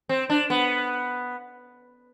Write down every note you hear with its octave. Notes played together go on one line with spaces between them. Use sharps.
C4
D4
B3